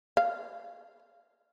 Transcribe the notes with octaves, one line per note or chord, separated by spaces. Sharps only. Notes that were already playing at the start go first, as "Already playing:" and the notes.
F5